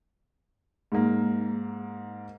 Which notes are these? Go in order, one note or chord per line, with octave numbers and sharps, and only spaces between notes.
G#2 A#3